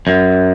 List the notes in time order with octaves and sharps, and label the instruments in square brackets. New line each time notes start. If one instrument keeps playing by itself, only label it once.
[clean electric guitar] F#2